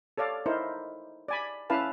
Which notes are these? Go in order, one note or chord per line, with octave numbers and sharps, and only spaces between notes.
A4 C#5 D5 F5
D#4 E4 A#4 C5
D5 G#5 B5
C#4 E4 B4 F5 A5